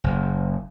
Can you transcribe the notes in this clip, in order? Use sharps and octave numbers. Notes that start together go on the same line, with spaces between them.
F#1